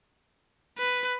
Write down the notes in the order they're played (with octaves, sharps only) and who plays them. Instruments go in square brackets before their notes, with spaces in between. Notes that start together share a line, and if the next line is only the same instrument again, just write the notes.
[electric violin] B4